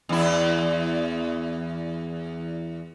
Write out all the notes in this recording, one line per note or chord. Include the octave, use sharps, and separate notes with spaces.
E2 E4